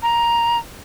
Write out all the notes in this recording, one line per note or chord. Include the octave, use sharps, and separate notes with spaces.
A#5